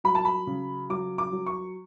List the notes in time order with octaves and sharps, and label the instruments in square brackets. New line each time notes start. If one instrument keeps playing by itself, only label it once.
[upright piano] F#3 B5
A5
B5
C#3
F#3 D6
D6
F#3
C#6